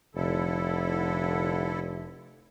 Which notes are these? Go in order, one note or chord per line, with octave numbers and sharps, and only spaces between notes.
F1 D3 E4 A4